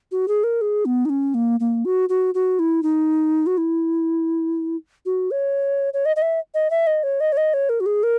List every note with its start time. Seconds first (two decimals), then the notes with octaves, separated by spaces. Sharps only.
0.12 F#4
0.28 G#4
0.44 A#4
0.61 G#4
0.85 B3
1.05 D#4
1.10 C#4
1.34 A#3
1.60 A#3
1.85 F#4
2.09 F#4
2.35 F#4
2.59 E4
2.83 D#4
3.47 F#4
3.58 E4
5.06 F#4
5.31 C#5
5.94 C#5
6.06 D#5
6.16 D#5
6.22 E5
6.54 D#5
6.70 E5
6.87 D#5
7.03 C#5
7.20 D#5
7.32 C#5
7.37 D#5
7.54 C#5
7.69 A#4
7.80 F#4
7.86 G#4
8.03 A#4